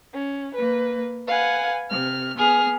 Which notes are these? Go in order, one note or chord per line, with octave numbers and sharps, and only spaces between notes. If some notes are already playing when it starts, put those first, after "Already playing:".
C#4
A#3 B4
B4 F5 F#5 G#5
C3 F6
B3 G#4 F6